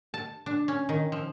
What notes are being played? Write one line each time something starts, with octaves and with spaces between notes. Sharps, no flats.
A5
D4
C#4
D#3
F3